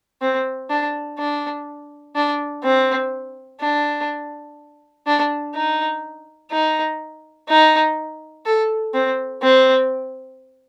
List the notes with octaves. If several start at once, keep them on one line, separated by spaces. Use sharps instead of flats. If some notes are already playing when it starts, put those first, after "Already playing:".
C4
D4
D4
D4
C4
D4
D4
D#4
D#4
D#4
A4
C4
C4